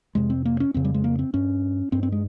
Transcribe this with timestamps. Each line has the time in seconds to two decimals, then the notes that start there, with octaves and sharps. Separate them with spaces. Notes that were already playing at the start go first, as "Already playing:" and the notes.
0.15 F2 C3 G#3
0.30 C4
0.45 A#3
0.60 C#4
0.74 F2 C#3 C4
0.84 G3
0.94 G#3
1.04 A#3
1.19 C4
1.34 G2 C#4
1.92 G2 C4
2.03 C4
2.12 G#3